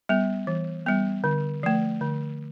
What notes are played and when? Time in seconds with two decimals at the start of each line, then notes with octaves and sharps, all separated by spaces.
0.09 G3 B3
0.47 E3
0.86 G3 B3
1.24 D3
1.63 F3 A3
2.01 D3